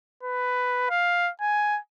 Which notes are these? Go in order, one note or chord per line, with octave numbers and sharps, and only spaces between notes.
B4
F5
G#5